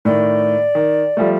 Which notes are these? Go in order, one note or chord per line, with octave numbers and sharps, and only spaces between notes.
A2 D#3 D5
D#3
F3 G3 A3